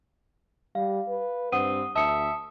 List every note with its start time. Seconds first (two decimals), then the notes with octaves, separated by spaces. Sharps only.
0.75 G3 F5
1.09 B4
1.52 G2 C4 F#5 D#6 D#7
1.96 D2 E5 A5 D#6 C#7